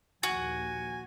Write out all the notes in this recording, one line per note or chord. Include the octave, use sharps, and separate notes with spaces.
A#1 D#2 F#4 G#5